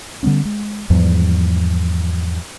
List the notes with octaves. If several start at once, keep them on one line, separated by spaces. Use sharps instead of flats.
D3 G3 B3 C#4
G#3
E2 G#2 F3 G3